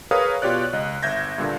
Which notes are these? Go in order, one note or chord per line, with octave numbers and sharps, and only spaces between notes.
G#4 A#4 B4 C#5 F5 D#6
B2 F4 G4 C#5 D5 F#6
C#2 D#5
G1 E5 G6 G#6 A#6
G2 A#2 D3